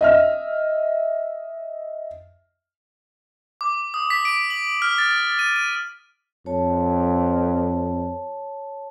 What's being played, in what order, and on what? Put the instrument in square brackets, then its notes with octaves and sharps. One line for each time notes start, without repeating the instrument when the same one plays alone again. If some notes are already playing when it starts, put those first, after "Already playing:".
[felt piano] D#5 E5 F6
[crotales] D6
D#6
B6
D7
F#7
F6
A6
D#7
D#7
[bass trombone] F2 [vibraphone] C#5 A5